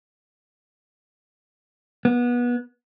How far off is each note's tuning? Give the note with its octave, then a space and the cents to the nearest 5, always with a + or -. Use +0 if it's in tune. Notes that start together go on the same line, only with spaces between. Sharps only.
B3 -25